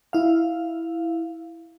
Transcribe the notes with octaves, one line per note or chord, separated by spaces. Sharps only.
E4 F5